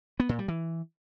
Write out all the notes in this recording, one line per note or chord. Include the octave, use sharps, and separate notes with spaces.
B3
A#2
G3
E3